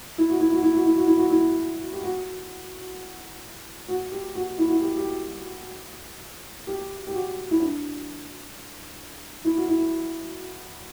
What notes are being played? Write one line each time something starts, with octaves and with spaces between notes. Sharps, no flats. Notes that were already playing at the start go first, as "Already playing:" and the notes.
E4
F#4
E4
F#4
E4
F#4
E4
F#4
E4
F#4
E4
G4
F#4
F#4
G4
F#4
E4
F#4
E4
G4
G4
G4
G4
F#4
E4
D4
E4
F#4
E4